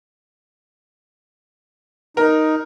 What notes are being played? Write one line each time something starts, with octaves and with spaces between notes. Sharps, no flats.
D#4 A#4